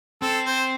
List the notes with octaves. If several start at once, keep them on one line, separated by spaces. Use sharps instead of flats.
C4 A4
C5